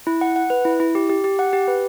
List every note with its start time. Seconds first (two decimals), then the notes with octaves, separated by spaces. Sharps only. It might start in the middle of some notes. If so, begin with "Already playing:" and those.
0.07 E4
0.21 F#5
0.36 F#5
0.50 B4
0.65 E4
0.80 E4
0.95 G4
1.09 G4
1.24 G4
1.39 F#5
1.53 G4
1.68 B4